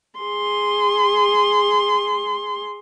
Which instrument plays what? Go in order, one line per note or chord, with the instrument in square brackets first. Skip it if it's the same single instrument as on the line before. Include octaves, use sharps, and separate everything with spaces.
[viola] G#4 C6